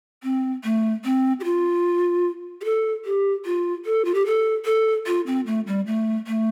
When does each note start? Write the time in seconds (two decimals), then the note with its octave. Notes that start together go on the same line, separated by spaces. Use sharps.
0.24 C4
0.64 A3
1.05 C4
1.40 G4
1.44 F4
2.61 G4
2.65 A4
3.05 G4
3.46 F4
3.86 A4
4.05 F4
4.15 G4
4.26 A4
4.65 A4
5.07 F4
5.27 C4
5.46 A3
5.67 G3
5.87 A3
6.27 A3